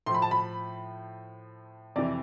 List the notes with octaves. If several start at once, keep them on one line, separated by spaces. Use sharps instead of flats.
A2 F3 C6
B5
A5
B5
F2 C3 E3 D5